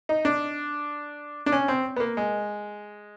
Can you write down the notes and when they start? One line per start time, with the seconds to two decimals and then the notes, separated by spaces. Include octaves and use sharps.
0.09 D#4
0.25 D4
1.46 D4
1.52 C#4
1.68 C4
1.96 B3
2.00 A#3
2.17 G#3